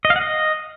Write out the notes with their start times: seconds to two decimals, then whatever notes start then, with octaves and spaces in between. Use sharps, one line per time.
0.05 D#5
0.10 F5
0.16 F#5
0.21 D#5